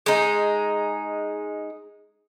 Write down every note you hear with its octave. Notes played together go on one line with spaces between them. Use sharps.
G#3 D#4